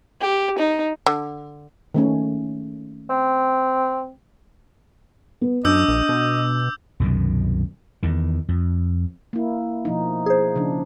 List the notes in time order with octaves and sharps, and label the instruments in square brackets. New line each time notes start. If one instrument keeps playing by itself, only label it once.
[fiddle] G4
D#4
[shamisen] D3
[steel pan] D#3 A3 C#4
[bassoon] C4
[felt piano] B3
[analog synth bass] F#2 [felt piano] D4 [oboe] D#5 [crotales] D6 E6 G6
[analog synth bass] A#1
B2
[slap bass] C2 F#2 B2 D#3
E2 D#3
F2
[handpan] A#3 E4
B2 F3 D#4
[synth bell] G#4 C5
[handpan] C#3 F3 D4